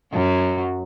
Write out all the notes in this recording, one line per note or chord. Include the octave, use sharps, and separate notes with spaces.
F#2 F#3